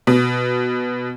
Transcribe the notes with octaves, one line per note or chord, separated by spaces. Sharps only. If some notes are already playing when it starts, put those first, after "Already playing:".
B2